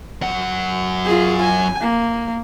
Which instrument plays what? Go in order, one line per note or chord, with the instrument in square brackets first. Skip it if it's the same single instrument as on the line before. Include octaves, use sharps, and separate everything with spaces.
[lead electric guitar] F#2 F#5
[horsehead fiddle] F4 G#4
G#5
A#3